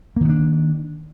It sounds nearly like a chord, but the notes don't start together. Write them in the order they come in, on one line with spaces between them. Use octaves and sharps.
A#3 D#3 B3 D4